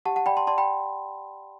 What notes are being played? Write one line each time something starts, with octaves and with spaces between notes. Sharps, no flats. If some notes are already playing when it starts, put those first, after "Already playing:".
G4 F#5 A5
F#5 A5
D5 G5 B5
A5 C6
D5 A5 C6
G5 B5